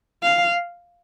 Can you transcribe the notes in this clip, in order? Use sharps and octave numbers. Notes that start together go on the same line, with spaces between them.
F5